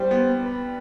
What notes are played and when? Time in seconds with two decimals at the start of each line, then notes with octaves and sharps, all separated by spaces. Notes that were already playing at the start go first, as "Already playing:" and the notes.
Already playing: G3 C5
0.11 B3
0.44 B4